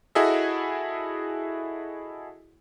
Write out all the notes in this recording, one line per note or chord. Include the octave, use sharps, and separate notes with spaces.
E4 F#4 G#4 A4 D#5 E5